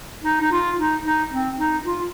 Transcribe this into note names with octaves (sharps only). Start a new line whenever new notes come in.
D#4
D#4
F4
D#4
D#4
C4
D#4
F4